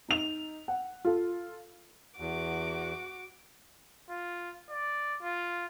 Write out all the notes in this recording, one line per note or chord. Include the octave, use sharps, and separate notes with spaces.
D#4 F7
F#5
F4 A4
E2 F#4 D6
F4
D5
F4